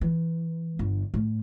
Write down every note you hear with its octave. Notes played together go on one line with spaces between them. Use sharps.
E3
G1 D3
A2